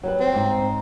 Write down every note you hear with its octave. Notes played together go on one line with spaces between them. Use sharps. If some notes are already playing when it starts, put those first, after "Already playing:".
F#3 G3 B4
C4
G#2 D#4